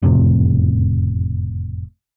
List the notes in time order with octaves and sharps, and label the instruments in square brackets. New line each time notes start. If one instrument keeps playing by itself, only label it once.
[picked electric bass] F#1 F2 A2 C3